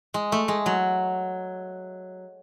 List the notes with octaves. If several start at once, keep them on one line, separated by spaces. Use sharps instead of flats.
G#3
A3
G#3
F#3